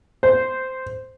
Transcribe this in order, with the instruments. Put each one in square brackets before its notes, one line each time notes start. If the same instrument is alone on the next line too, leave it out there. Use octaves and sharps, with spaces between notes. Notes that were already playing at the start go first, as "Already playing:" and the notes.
[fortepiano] C5